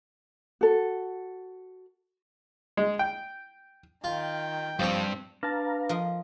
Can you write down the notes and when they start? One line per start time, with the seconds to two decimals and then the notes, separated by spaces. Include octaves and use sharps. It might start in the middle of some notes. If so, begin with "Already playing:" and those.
0.61 F#4 A4
2.77 G#3
2.99 G5
4.04 D#3 F4 G5
4.79 G2 F3 C4 C#5
5.43 D4 B4 F5 A5 A#5
5.89 F3 A#4 D#5